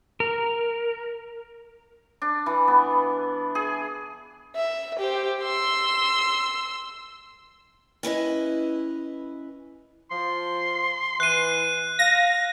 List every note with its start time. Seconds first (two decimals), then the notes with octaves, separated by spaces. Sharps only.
0.20 A#4
2.22 D4
2.46 E3
2.68 B3
3.55 G#4
4.55 E5
4.99 G4 C5
5.42 C6 E6
8.03 C#4 E4 B4 D#5
10.11 F3 C6
11.20 E3 F#6 D#7
11.99 F5 A#6